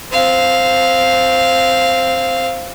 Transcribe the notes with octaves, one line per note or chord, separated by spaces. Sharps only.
C4 F5